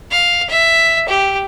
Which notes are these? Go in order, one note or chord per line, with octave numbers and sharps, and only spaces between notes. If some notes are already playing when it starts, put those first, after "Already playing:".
F5
E5
G4